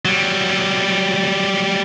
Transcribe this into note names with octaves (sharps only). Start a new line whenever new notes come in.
F#3 G3